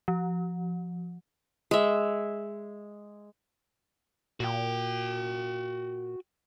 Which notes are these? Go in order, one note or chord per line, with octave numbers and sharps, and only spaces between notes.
F3
G#3 E5
A#2 F#4 G5